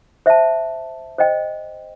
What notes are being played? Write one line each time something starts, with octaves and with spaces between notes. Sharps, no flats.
C5 E5 A5
C5 D#5 G5